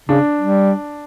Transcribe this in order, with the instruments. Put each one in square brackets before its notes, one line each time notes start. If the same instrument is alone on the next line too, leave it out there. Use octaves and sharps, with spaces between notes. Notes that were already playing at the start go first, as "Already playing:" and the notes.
[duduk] C#3 [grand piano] D4
[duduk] G3